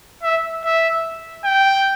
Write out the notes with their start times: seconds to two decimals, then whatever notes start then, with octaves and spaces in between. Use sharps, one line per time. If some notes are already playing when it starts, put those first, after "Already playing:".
0.23 E5
0.64 E5
1.45 G5